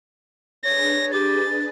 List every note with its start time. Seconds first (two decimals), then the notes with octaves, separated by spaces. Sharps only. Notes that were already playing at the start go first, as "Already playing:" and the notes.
0.65 D4 G#4 B4 C#5 A#6
1.13 G4 A6